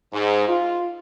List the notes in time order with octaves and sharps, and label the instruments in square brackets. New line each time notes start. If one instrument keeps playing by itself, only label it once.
[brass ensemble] G#2
F4